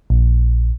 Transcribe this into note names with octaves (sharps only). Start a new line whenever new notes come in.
A#1